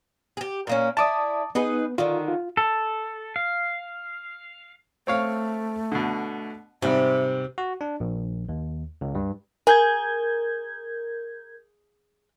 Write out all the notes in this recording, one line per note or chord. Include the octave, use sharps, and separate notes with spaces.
G4 G#4
A#2 A#3 C#4
E4 D5 A5 D6 D#6
B3 D#4 G#4 B4
D3 D#3 F4
F4
A4
F5
A3 C4 C#5 F5
B2 D3
G#2 C3 G3 C4 E5
F#4
D4
A#1
D#2
C#2
G2
G#4 A#4 G6 G#6